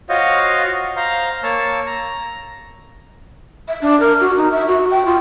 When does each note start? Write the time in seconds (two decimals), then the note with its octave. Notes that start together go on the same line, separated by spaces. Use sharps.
0.09 F4 F#4 C5 C#5 D#5 F5
0.96 C5 F5 A#5
1.43 A#3 C#5 A5 E6
1.86 A#5
3.68 E5
3.82 D4
4.00 A#4
4.20 F#4
4.37 D#4
4.51 E5
4.67 F#4
4.91 G5
5.05 F4